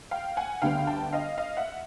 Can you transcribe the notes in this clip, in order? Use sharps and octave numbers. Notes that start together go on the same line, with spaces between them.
F5 G5
F#5 G#5
D2 D3 G3 B3 D4 F5 G5
G5 A5
D#5 F5
D#5 F5
E5 F#5